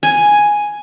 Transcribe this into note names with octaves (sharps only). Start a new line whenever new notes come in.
G#5